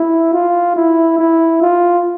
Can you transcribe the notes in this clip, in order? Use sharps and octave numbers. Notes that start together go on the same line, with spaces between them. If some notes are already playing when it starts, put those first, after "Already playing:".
Already playing: E4
F4
E4
E4
F4